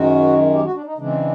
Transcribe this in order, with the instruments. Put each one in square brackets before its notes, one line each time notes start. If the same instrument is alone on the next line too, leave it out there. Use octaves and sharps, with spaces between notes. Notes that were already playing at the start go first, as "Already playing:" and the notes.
Already playing: [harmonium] F#2 D#3 G#3 F#4
G4
F#4
D4
D#4
C#3 E3 G#3 C4 D4